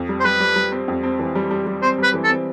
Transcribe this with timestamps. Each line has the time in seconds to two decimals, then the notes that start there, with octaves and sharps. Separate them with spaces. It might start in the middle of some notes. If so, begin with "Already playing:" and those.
Already playing: F2
0.09 G3
0.20 C5
0.24 G3 B4
0.40 G3
0.56 G3
0.72 C4
0.88 F2
1.03 C4
1.19 E3
1.35 G3
1.51 G3
1.67 G3
1.82 C4 C5
1.99 G3 B4
2.14 E3
2.24 A4
2.30 C4